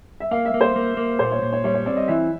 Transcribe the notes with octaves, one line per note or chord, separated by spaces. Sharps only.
E5
A#3 F5
E5
A#3
C5
A#3
A#3
A#2 C5
C#5
A#2
C#5
G3 C#5
C#5
C4 D5
D#5
E3 E5